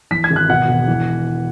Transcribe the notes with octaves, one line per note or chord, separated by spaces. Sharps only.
E3 B6
G#6
G#1
F#6
B2 F#5
E1
E3